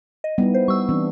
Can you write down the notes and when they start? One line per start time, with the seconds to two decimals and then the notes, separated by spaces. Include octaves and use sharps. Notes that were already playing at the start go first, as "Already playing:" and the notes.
0.24 D#5
0.38 G3 B3 D#4 E4
0.54 C5
0.68 G3 C#6 E6
0.89 E3 C4 D4